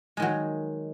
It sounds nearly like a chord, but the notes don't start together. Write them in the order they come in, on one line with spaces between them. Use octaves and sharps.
G#3 D#3 F#3